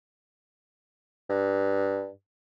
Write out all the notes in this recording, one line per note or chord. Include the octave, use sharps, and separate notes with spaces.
G2